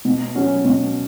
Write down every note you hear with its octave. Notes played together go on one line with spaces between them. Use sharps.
B2
F#3 C#4 F#4
B2